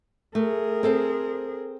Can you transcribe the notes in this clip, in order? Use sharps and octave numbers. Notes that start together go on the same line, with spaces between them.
A3 G#4 A#4
C4 A4 C5